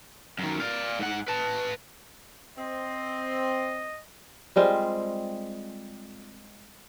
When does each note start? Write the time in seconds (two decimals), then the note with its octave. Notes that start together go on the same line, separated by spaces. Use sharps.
0.39 F#2 D#3
0.60 D5 F5
0.99 G#2 F#5
1.28 B4 A5
2.58 C4 D#5
4.56 G3 G#3 C4 F4